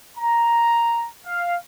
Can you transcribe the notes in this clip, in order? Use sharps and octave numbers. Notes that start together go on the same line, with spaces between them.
A#5
F5